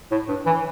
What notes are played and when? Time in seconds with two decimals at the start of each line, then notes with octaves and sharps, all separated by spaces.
0.11 A2
0.28 G2
0.46 E3